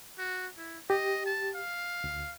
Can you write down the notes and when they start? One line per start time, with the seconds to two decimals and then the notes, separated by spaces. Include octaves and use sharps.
0.18 F#4
0.58 E4
0.90 G4 D#5
1.26 A5
1.55 F5
2.04 D2